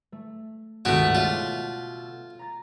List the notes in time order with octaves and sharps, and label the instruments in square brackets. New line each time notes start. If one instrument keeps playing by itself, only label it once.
[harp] A3
[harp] C#2 G2 D#3 [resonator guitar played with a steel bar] B2 A3 [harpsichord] B3 F#4
[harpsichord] F4 [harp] F#4 D5 E5
[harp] A#5 A6